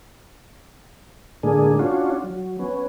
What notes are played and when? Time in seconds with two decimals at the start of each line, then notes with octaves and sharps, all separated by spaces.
1.43 A2 D3 G#3 A#3 D4 G#4
1.79 C#4 D4 F4 F#4
2.24 F#3
2.59 B3 C#4